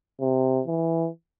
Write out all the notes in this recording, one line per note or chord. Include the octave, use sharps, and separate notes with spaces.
C3
E3